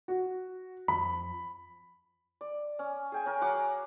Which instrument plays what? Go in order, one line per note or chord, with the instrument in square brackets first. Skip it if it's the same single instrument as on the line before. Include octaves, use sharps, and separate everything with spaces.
[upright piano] F#4
[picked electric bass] F2 F3 [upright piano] B5
[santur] D5
C#4
G#4 G5 G#5
C#4 A#4
F#3 F#5 D6